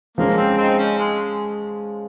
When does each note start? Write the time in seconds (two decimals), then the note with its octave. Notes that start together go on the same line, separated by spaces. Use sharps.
0.17 F3 G#3 A#3 C#4
0.37 C4
0.57 C4 D#4
0.78 C#4
0.98 G#3